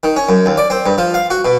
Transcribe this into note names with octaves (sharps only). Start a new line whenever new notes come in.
D#3
C#4
F#2
D#2
D5
C4
G2
F3
F5
F#4
B2